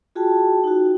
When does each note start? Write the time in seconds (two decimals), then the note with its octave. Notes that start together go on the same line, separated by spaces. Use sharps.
0.15 F4 F#4 G#4 G5 A5
0.64 D#4 F#4